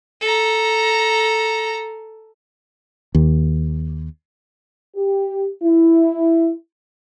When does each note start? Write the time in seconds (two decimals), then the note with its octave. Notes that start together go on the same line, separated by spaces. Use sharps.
0.21 A4 A#5
3.15 D#2
4.96 G4
5.62 E4